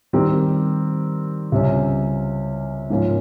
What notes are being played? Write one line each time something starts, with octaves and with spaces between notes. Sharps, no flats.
D#3 G3 C4 G4 A#4
C#2 C3 G3 C#4
G#2 F3 A#3 C#4